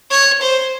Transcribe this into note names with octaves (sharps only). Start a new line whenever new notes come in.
C#5
C5